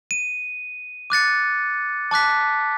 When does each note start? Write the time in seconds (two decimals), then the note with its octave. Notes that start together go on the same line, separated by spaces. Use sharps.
0.11 D#7
1.10 D6 F#6 A6 C#7
2.11 A5 D6 F#6 B6